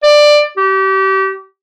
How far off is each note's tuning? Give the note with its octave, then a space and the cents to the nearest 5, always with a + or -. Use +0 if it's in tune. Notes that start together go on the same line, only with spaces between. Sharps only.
D5 +15
G4 -30